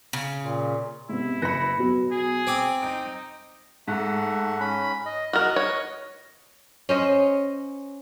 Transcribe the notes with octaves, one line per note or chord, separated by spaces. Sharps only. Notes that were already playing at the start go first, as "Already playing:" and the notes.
C#3
A#2
G#2 C3 B3 E4
F#1 B4 B5 A#6 C#7
B2 F#3 B3
G#4
C4 D6
D#4 G6 D7
G#2 A3 F#5
C#4 B5
D#5
F#4 A#4 D#5 F6 F#6
C#5
C#4 C5 D#5